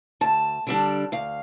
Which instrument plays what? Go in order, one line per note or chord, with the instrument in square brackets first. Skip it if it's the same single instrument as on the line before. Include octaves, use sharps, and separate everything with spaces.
[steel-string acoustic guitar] D2 A5
D3 G3 D4
D2 F5